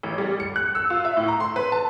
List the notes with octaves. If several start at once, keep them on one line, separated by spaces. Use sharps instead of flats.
A1
G3
C#7
F#6
E6
F4
E5
A2
A#5
C6
B4
A5